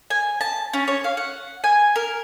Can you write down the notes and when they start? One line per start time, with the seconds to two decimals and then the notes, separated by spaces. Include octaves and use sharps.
0.10 G#5
0.41 A5
0.73 C#4
0.88 C#5
1.04 F5
1.17 F#5
1.64 G#5
1.96 A#4